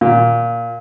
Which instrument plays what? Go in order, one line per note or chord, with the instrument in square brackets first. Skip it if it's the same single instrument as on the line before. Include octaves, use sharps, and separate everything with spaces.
[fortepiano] A#2